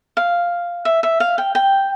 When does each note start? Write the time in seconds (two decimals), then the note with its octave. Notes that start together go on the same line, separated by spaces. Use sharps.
0.17 F5
0.85 E5
1.03 E5
1.20 F5
1.38 G5
1.55 G5